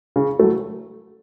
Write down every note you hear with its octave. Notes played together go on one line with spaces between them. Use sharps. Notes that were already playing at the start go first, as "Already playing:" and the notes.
C#3
F#3 A3